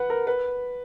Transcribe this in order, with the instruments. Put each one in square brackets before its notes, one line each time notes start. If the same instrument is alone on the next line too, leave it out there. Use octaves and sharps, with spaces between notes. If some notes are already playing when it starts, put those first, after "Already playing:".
Already playing: [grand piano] B4 F#5
A#4
B4